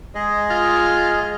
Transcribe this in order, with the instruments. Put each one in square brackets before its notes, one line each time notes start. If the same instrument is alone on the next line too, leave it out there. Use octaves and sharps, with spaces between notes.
[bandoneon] G#3 G#4 D#5
[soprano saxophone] F4